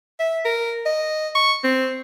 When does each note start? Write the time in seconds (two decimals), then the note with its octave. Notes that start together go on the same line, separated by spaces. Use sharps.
0.20 E5
0.45 A#4
0.86 D#5
1.35 C#6
1.64 C4